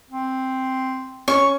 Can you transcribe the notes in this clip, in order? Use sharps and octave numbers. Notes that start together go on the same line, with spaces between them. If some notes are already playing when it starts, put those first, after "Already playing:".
C4
C#4 C#6